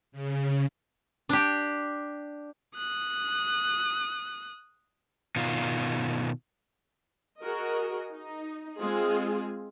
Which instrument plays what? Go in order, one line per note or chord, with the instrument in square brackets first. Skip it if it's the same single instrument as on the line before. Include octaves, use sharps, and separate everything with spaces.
[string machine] C#3
[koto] D4 G4
[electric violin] D#6 F#6
[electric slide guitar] B2 D#3 F4
[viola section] F#4 G#4 A#4 D#5
D#4
G#3 C4 F4 G#4